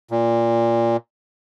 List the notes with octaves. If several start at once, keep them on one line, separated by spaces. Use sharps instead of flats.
A#2